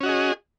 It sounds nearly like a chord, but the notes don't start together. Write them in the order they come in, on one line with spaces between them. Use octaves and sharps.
C#4 F#4 D#5 G#4